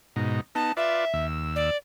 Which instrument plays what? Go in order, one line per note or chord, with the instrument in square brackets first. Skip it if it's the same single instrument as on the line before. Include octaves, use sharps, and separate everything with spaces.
[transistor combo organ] G#2 B2 D#4
[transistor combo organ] B3 D#4 [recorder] A5
[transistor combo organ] F4 B4 D5 [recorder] E5
[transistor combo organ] D#2 E6
[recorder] D5